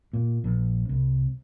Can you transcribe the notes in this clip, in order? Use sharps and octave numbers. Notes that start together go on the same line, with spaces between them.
A#2
A#1
C2